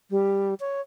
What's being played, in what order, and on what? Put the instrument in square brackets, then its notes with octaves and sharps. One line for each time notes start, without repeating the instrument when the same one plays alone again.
[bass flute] G3
C#5